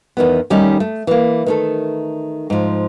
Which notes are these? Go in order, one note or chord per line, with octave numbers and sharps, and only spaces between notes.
E2 D#3 B3
D#3 G3 A3 C#4 D#4
A3
E3 A#3
D#3 A3 A4
G#2 F3